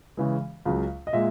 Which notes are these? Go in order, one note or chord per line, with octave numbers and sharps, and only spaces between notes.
C#3 E3 G#3
C#2 C#3 F#3
D#5
A#2 G#3 E5